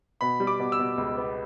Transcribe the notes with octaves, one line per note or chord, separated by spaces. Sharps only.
B2 B5
G3
D6
B2
E6
B2
C#2
B3